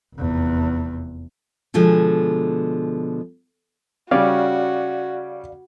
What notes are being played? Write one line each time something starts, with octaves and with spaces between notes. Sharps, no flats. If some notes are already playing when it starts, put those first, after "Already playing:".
F1 E2
B2 D3 F3 G#3
C#3 G3 C#4 F#4 D5 F5